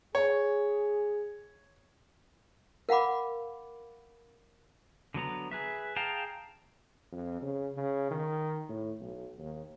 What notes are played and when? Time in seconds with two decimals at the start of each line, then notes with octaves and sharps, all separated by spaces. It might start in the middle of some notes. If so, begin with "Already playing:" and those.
0.15 G#4 C#5
2.89 A#4 F5 F#5 B5 D6
5.14 D3 F#3 B3 A#5
5.51 G#4 B4 E5
5.96 G#4 F5 G5 A5 A#5
7.12 F2
7.42 C#3
7.77 C#3
8.11 D#3
8.69 A2
9.00 B1
9.38 D#2